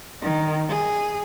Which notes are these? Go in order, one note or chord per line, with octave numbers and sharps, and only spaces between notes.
D#3
G#4